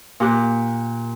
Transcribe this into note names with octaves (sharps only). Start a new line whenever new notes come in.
A#2 G4 F#6